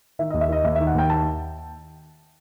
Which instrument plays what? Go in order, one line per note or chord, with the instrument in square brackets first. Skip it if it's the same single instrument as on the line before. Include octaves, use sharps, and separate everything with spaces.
[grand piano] D#3 E5
D#2 D#5
E5
D#3 D#5
D#2 E5
D#3 E5
F#5
D#2 G5
A5